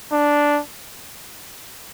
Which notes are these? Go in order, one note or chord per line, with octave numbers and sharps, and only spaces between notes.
D4